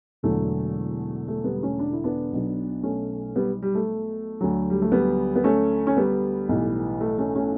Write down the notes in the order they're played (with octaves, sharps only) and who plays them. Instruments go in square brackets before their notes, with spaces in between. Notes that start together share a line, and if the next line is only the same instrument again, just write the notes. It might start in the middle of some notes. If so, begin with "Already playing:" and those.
[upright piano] E1 E2 D3 F#3 A3
A3
G3 B3
A3 C#4
D4
E4
B3 D4
B1 B2 F#3
A3 C#4
G3 B3
G3
A3
D2 D3 F#3
G3
A3
G3 B3
B3
A3 C#4
C#4
G3 B3
B1 A2 E3
A3
A3 C#4
A3 C#4